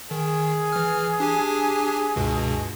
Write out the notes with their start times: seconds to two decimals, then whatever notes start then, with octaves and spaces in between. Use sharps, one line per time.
0.11 D#3 G#4
0.72 E3 F6
1.20 D4 G4 G#5
2.16 C#2 G2 B2